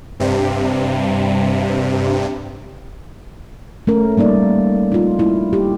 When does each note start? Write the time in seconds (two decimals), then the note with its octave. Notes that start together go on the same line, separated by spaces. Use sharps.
0.20 G2 C3
3.87 A3 C#4 A#4
4.17 G3 A#3 D#4 D5
4.92 D#4 F4
5.19 A#3 E4
5.53 G4